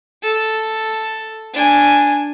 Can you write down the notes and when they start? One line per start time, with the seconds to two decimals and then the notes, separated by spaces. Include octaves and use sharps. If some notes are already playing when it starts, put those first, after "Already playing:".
0.23 A4
1.54 D4 G#5